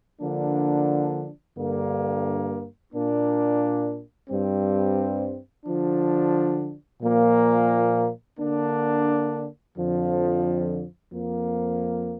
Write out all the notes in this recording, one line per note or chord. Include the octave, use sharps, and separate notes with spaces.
D3 F3 A#3 D4
G2 D3 A#3
A#2 A#3 D4
G2 G3 C4
D3 F3 D4
A#2 F3 A#3
D3 A#3 D4
F2 D3 F3
F2 F3 A#3